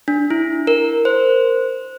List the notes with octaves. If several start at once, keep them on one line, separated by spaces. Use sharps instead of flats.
D4
E4
A#4
C5